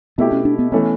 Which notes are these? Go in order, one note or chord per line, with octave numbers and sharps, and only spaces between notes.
B2 A3 B3 E4 G4
C#4
D4
B3
E3 A3 B3 C#4